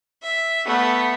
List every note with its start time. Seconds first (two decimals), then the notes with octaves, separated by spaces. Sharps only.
0.23 E5
0.66 A3 B3